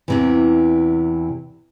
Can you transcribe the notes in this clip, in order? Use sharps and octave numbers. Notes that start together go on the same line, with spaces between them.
E2 C3 E3